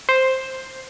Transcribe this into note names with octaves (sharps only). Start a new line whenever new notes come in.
C5